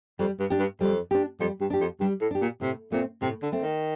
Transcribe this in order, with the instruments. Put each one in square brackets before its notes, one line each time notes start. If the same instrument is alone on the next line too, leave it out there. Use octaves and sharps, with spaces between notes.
[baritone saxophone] F2 [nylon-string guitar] G3
[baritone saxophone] G2
[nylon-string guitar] D4 G4
[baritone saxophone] G2
[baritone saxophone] F2 [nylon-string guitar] G3
[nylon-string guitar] D4 G4
[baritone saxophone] F2 [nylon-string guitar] G3
[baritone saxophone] G2
[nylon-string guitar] D4 G4
[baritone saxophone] F2
[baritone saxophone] G2 [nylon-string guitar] G3
[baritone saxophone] A2
[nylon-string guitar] D4 G4
[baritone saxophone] A#2
[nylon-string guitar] A2 [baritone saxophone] C3
[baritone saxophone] A#2 [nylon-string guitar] A3 C4
[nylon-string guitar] A2 [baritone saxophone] C3
[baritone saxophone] D3
[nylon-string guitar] A3 C4
[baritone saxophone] D#3